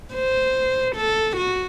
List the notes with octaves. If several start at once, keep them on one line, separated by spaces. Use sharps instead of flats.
C5
A4
F#4